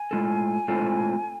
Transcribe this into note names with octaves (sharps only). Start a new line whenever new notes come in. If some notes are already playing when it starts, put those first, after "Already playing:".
Already playing: G#5
A2 G#3 C4 F4 A4
A2 G#3 C4 F4 A4